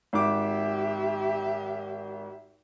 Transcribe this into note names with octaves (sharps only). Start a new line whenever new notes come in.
G#1 G4 E5 D6